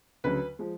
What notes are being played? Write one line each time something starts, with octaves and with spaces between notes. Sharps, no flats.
D2 C#3 F#3 B4
F3 G#3